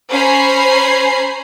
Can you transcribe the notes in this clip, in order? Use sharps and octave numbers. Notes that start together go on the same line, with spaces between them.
C#4 C5 G#5 A#5 B5 C7